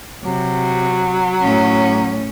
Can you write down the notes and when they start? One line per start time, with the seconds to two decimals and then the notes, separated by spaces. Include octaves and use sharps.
0.24 C3 F#3
1.42 A2 C#4